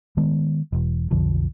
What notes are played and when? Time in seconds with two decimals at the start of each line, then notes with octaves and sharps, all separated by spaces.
0.17 D#3 G#3 B3
0.72 E1
1.11 B1 F2 D3 F3